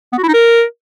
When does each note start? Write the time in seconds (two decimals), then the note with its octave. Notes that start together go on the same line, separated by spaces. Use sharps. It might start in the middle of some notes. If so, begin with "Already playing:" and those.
0.13 B3
0.18 F#4
0.23 E4
0.28 D#4
0.34 A#4